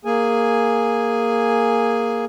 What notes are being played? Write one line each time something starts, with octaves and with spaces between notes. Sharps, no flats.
A#3 G#4 G#5